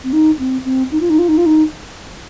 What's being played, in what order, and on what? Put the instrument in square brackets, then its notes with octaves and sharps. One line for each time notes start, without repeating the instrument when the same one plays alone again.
[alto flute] C4
D#4
C4
C4
D#4
F4
D#4
F4
D#4
F4
D#4